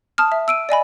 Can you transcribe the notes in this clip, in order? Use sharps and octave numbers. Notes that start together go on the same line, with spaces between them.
A5 D#6 F6
E5
E6 D7 D#7
D5 D#5 G#5 B5